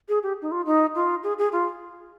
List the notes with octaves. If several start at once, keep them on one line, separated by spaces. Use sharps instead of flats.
G#4
G4
D#4
F4
D#4
F4
G#4
G#4
F4